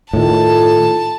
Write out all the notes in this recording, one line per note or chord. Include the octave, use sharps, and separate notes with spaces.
A2 D#3 F4 A4 A5